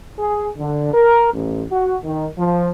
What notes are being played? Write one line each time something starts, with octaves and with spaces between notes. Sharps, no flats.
G#4
D3
A#4
A1
F#4
D#3
F3